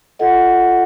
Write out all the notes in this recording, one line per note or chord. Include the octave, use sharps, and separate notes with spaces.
F4 A4 D#5 F#5